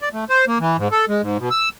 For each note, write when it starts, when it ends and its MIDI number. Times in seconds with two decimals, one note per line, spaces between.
0.02 0.09 74
0.13 0.25 57
0.29 0.45 72
0.47 0.58 58
0.60 0.77 52
0.78 0.88 44
0.92 1.05 69
1.08 1.22 56
1.22 1.37 44
1.39 1.49 47
1.50 1.69 88